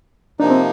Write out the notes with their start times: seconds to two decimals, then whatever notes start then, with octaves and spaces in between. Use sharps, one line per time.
0.40 C3 F3 A#3 D4 D#4
0.50 C4